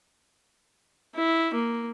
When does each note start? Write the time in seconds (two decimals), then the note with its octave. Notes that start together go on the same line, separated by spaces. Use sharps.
1.15 E4
1.54 A#3